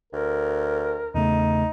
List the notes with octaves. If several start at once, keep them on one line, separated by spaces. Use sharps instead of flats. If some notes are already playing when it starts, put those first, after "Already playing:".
D2 A#4
E2 C#3 A3 D#4